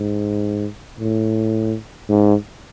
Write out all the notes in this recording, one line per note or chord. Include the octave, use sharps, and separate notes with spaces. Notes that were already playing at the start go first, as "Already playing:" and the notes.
Already playing: G#2
A2
G#2